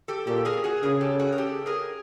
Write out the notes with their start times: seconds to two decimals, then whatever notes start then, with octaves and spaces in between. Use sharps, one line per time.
0.08 G4 A4
0.27 A#2 G4 A4
0.45 G#4 A#4
0.64 F#4 G#4
0.83 C#3 G#4 A#4
1.01 G4 A4
1.19 F#4 G#4
1.32 A#4
1.38 G4 A4
1.66 G#4 A#4